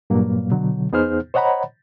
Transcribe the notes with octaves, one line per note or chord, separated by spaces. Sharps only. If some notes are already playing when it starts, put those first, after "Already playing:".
G2 A#2 F#3 A#3
B2 D3 F#3
E2 B3 D#4 G#4 C5 F6
C5 C#5 D#5 F#5 A#5 B5